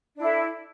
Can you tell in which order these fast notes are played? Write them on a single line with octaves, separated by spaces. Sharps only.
D4 E4 A4